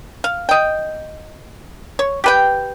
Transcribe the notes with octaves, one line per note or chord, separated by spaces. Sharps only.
F5
D#5 G5
C#5
G4 B4 G5